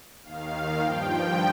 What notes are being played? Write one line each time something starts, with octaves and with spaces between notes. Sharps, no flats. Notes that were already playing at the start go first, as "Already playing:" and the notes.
D#2 D#3 F5
G2 F3 G5